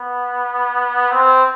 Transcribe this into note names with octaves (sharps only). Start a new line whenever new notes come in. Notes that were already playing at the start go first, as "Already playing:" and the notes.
Already playing: B3
C4